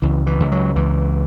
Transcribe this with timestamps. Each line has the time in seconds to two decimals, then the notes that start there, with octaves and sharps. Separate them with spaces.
0.02 C#2 E3
0.27 E3
0.40 C#2
0.52 F#3
0.76 C#2 E3